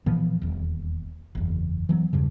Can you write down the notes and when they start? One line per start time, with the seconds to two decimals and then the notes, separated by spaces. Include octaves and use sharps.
0.06 A#2 E3 F3 B3
0.42 D#1 E2
1.35 F#1 E2
1.89 E3 F#3 B3
2.13 E2 G2 C#3